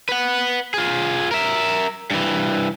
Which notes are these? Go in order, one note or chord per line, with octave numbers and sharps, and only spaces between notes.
B4 F#5
F4 G#4
A#4 E5
G2 E3